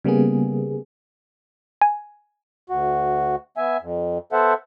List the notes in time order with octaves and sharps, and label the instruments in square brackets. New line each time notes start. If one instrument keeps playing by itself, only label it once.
[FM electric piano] C#3 G3 A#3 B3 G#4
[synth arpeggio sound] G#5
[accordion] D2 F#4
B3 E5 G#5
F2
B3 A4 C5 E5 F#5